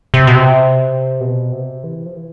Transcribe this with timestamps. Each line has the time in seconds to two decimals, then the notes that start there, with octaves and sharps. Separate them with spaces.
0.14 C3
0.27 B2
0.35 C3
1.21 B2
1.52 C3
1.84 E3
2.06 F3
2.16 E3